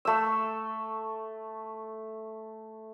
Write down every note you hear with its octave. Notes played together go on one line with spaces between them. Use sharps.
A3 E6